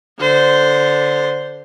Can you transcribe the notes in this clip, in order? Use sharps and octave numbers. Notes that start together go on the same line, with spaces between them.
D3 C5